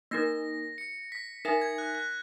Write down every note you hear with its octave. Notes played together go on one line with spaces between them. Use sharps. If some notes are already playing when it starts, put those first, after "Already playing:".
A#3 D#4 A#4 A#6
C#7
B6
D#4 A#4 E5 G#5 A#6
G#6
F#6
F#6